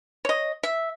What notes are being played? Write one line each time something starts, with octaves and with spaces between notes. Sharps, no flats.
C#5 D#5
E5